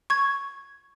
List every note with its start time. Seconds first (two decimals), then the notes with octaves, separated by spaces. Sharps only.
0.10 C#6 G#6